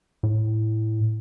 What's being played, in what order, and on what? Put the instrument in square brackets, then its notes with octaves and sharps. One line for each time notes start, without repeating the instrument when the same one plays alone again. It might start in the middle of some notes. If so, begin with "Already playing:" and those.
[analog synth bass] A2